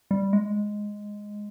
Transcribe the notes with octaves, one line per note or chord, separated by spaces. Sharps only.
G3
G#3